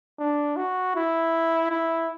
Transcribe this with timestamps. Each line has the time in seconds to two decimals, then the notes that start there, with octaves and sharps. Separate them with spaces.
0.19 D4
0.57 F#4
0.95 E4
1.71 E4